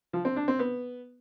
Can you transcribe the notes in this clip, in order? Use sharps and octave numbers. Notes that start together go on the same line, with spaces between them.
F3
C4
D4
C4
B3